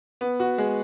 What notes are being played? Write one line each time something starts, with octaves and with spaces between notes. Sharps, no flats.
B3
F#4
G#3